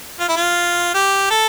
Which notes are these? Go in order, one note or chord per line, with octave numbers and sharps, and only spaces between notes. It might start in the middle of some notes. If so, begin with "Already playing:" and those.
F4
E4
F4
G4
A4